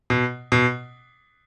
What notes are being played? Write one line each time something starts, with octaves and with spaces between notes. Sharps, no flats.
B2
B2